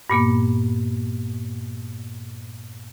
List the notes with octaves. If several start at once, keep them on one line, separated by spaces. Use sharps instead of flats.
G2 A#2 A#3 B3